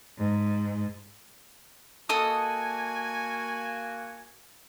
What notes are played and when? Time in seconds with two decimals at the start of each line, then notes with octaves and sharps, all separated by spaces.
0.17 G#2
2.09 A#3 F#4 A4 D#5 G#5 D#6